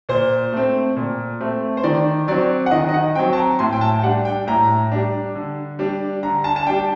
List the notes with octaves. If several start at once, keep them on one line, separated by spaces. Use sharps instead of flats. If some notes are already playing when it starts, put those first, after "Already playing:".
A#2 C5
A3 C4
A#2
A3 C4
C5
D#3 D5
F#3 C4 D5
F#5
D#3 D#5
D#5
F#5
F#3 C4 G5
A5
A#5
A2 C6
G5
A5
G3 D4 F#5
G5
A2 A#5
G3 D4
D3
G3 D4
D3 A#5
A5
A5
G3 D4 G5